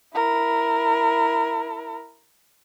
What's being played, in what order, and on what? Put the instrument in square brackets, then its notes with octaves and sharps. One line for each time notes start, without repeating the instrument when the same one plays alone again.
[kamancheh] E4 A#4